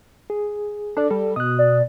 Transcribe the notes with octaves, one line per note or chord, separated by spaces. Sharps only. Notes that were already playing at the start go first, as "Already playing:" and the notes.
G#4
D4 A4 D5
G3 A4
B2 D#6 F#6
D5